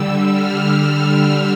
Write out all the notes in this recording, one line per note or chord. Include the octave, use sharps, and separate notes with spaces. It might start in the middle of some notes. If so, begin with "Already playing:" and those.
Already playing: D3 G3 E6
F6